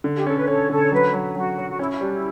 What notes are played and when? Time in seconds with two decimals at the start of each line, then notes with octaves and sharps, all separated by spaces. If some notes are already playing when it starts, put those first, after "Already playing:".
0.04 D3
0.15 G4
0.27 C#4 A4
0.37 B4
0.47 C#4 A4 C#5
0.70 D3 A4 C#5
0.92 F#3 B4
1.13 F#3
1.36 F#3 F#4
1.58 F#3
1.69 F#4
1.79 C#4 E4
1.90 E4
2.01 G3 D4
2.12 E4